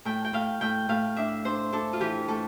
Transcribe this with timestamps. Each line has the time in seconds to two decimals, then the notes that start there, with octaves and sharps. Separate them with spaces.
0.05 A2 G5
0.25 G5
0.33 A2 F5
0.61 A2 G5
0.89 A2 F5
1.16 D4 E5
1.45 D4 C5
1.73 D4 A4
1.93 F4
2.00 E3 G4
2.28 A2 A4